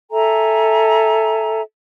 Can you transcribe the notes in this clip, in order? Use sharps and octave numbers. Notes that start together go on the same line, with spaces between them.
A4 E5 G#5 A#5